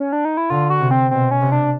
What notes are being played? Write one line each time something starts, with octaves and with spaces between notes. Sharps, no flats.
C#4
D4
D#4
E4
D3 F4
F#4
C3
C4
B2 C4
C#4
C3
D4